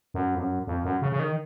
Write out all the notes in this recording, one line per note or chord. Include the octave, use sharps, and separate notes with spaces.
F#2
F2
F#2
F2
F#2
C#3
C#3
D#3